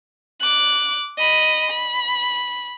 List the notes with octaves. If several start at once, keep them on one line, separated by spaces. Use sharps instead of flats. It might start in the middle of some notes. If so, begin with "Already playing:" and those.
D6 F#6
D#5 B5
B5